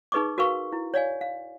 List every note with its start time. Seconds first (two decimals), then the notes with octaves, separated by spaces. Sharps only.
0.12 D#4 G#4 B4 D#5 C#6 D6
0.38 F#4 A#4 B4 F5 C#6
0.73 E4
0.94 C#5 D5 F5 G#5
1.21 F5